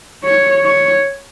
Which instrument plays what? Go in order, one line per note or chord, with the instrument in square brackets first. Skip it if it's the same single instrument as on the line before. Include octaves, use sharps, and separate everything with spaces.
[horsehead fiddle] C#5
C#5